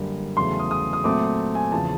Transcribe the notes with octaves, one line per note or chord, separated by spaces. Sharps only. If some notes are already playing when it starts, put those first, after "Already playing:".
Already playing: F#2 D3 G3 A#3
E2 C#3 F#3 A3 C6
D#6
D#6
D#6
A#2 F#3 A3 C4 D6
G#5
E2 C#3 F3 A5